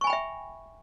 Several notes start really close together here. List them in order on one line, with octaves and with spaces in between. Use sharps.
C#6 G#5 B5 G5 E5